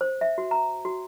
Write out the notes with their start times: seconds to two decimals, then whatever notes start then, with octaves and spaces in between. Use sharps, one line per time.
0.01 C5
0.21 E5
0.38 F#4
0.51 A#5
0.85 F#4